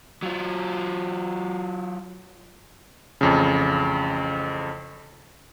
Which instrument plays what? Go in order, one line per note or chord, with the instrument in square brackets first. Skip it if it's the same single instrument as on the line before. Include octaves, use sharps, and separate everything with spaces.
[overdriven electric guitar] F#3 F4
[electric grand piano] A1 F2 C#3